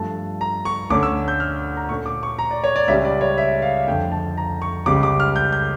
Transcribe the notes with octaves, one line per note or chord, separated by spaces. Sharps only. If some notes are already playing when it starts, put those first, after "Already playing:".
Already playing: G2 F3 A3 A5
A#5
C#6
D2 D3 A3 C#4 D6
E6
G6
F6
A#5
A#2 A3 C#4 C#6
D6
C#6
A#5
D5
C#5
D5
C#2 C#3 G3 C#4 E5
D5
C#5
E5
F5
F2 D3 A3 G5
A5
A#5
C#6
C#2 C#3 G3 D6
D6
F6
G6
G6